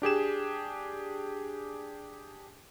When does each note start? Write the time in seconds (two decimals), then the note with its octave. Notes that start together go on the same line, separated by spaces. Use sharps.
0.02 D4 G4 G#4 E7